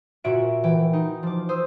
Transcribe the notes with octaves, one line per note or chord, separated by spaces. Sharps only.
A#2 F#4 E5 D7
E3 G5
D#4
F3 D6
C5 D#6 E6